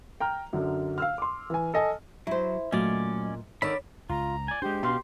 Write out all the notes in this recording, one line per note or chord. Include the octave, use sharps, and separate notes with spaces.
G5 A#5 F6
F#2 D3 F#3
F5 E6 F6
C6 D6
E3 G#5
A4 D#5 G#5
F#3 E4 C5
A#2 F#3 A3 C#4 D5 D#5
D3 D#3 C#5 D5 B5 E6
C#2 F4 A#5
D5 G#5
G#3 D4 G4 C5
B2 F5 C6